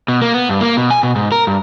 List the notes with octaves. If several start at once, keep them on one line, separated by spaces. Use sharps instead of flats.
B2
A#3
B3
G2
A#3
B2
G#5
B2
G#2
A#4
G2